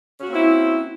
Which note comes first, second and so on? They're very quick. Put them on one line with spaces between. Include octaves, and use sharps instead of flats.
C#4 F#4 A#3 C4 E4